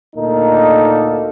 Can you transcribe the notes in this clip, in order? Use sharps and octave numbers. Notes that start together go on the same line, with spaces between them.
D2 A#2 A#3 D#4 A4